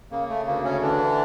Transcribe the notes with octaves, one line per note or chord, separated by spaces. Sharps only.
C#3 A#3
A3
D2 A#3
C#3 C#4
D3 E3 D4